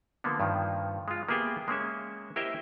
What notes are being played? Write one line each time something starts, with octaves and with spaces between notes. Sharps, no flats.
D3 F3 A#3 B3
G2 D#3 F3
G#3 F4
A#3 B3 G4 G#4 E5 G5
G#3 A#3 C#4 E5
E4 G4 A#4 C5 D#5 E5